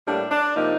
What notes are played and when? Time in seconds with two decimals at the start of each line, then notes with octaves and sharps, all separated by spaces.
0.06 A2 G3 A#3 D4
0.31 D4
0.55 C3 F3 A#3 D#4